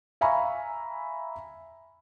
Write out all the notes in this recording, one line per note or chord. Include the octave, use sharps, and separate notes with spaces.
E5 F5 G#5 A#5 B5 C#6